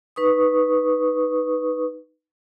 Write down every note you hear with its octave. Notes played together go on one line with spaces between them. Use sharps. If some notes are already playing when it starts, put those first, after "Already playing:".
D#4 B4 C#6 D#6